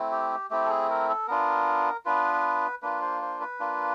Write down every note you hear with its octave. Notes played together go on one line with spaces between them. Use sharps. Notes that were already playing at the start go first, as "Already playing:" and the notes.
Already playing: A3 C4 E4
G4
A3 C4 E4 G4
A4
G#4
A#4
A4
B3 D4 F4 A#4
B3 D4 F4 B4
A#3 D4 F4 B4
C5
C5
B4
A#3 D4 F4